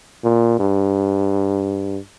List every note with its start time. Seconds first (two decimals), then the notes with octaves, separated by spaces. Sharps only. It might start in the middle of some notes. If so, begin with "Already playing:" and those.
0.24 A#2
0.59 G2